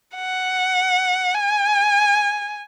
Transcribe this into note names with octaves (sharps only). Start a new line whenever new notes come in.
F#5
G#5